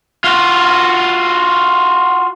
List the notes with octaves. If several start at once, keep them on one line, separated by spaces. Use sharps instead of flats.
F4 F#4